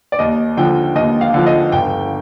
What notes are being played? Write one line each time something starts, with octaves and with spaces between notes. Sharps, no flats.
D5
D#2 D#5
D3 F3 G5
D#2 D#5
F5
D3 F3
D#5
G1 G5